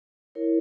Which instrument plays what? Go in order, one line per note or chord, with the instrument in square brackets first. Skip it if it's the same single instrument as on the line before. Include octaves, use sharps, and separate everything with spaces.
[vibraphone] E4 A#4 C#5